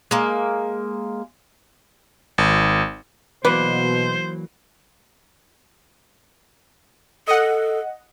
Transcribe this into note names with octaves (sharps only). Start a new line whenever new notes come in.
G#3 A#3
G#1
B2 E3 F#3 A#3 B4 C5 D5 F#5
A4 D#5 F#5